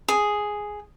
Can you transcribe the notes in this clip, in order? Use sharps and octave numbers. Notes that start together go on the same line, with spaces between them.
G#4